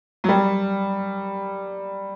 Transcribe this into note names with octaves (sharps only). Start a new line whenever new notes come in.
F#3
G3